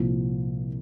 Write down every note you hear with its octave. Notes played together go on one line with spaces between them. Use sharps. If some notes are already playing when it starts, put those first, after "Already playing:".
Already playing: C2 A#2 F3